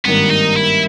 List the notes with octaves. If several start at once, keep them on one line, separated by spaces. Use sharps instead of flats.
G#1 G2 D#3 A#3 B3
D#4
E4